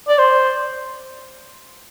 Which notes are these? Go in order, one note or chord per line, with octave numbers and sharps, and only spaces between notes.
D5
C5